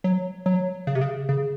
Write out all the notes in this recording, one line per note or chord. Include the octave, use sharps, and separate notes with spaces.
F#3
F#3
C#3
C3
C#3
C#3